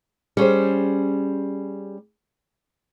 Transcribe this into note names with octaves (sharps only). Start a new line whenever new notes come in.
G3 C#4 G#4 C5